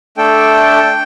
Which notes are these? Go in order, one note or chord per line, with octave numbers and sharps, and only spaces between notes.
A3 D4 A4 G5